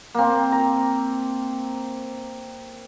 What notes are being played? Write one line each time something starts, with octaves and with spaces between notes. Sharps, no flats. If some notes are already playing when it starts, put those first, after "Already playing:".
A#3 C4
A#5